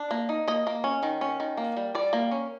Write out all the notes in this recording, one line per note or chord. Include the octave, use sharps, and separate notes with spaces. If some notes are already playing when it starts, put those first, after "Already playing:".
Already playing: D4
A#3
D#4
A#3 D#5
A#3
C#4
D#3
C#4
D#3
A#3
G3
G3 D5
A#3
C#4